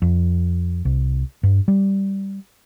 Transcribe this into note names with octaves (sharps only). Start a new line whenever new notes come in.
F2
C2
G2
G3